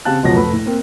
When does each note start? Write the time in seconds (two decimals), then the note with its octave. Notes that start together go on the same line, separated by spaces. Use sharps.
0.05 C#3 C4 G4 F5 A5 F#6
0.23 C#2 F#2 B2 F3 C#5 A#6
0.36 F1 A3 B4 B5
0.53 A2
0.66 A#3 C4